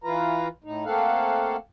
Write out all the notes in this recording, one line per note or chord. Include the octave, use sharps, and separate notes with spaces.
E3 F4 B4 A#5
A2 D#4
A3 A#3 C4 A4 F5 F#5